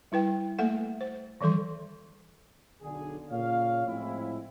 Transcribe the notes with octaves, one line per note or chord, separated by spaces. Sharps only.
G3 E4 B4 G5
A3 A#3 A4 E5 F#5
C5
D#3 E3 G3 A4 C6
B1 D3 G#4
A#2 C#3 C#5 F5
A2 F3 G#3 C4 E4